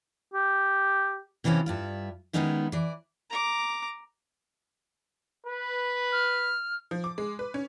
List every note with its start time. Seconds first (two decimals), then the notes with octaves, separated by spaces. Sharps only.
0.34 G4
1.44 C3 E3 F3 C4 C#4
1.66 G2 E4 F4
2.33 D#3 G#3 B3 C#4 D#4 E4
2.72 E3 D5
3.30 A#5 D6
5.45 B4
6.12 F6
6.91 F3
7.04 D6
7.18 G#3
7.39 B4
7.54 C#4